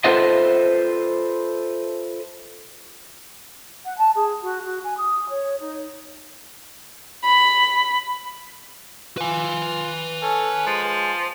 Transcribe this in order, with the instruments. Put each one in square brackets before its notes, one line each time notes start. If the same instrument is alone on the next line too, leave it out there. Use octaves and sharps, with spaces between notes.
[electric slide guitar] F4 A4 B4 C5 D#5 E5
[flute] F#5
A5
G#4
F#4
F#4
G#5
D#6
C#5
D#4
[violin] B5
[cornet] F4 [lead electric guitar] B4 G#5
[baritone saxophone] C#4 [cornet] A4
[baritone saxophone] F3 [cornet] G#3